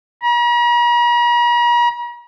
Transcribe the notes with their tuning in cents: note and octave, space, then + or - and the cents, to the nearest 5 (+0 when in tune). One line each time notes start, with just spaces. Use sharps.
A#5 +45